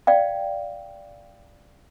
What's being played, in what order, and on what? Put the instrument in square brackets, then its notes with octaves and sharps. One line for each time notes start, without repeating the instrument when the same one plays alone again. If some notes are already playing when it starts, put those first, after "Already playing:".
[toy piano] D5 F5 G5